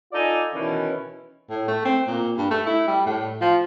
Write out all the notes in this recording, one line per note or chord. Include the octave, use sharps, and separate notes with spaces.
D#4 F4 A4 D5 G#5
B2 D#3 E3 C#4
A2
A3
C4
A#2
G2
A3
E4
G3
A2
F3